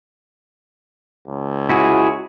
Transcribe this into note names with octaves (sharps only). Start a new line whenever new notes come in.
C#2
E4 F#4 G#4